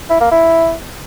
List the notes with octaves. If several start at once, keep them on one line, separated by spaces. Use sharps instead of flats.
E4
A#3
E4